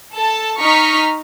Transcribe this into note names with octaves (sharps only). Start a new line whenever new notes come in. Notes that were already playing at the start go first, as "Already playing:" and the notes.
A4 A5
D#4 A#5 C#6 F6 B6